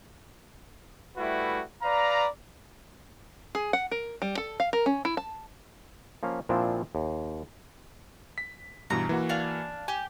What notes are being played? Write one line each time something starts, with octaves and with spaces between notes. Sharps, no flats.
G3 A3 E4 F#4 B4
B4 D5 F5 A#5
G#4
F#5
A#4
G3
A4
F5
A#4
C#4
E4
A5
F3 A#3 C#4 F5
A#2 F3 C4 D4 E4 C5
D#2
B6
G2 B2 E3 A#5
E3 A#3 F#4
D4 F5 G#5
G4 G#5